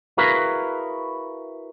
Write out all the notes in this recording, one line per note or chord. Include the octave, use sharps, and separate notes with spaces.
E4 F#4 G#4 A#4 B4 F5